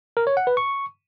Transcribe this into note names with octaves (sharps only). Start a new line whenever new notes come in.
A#4
C#5
F#5
B4
C#6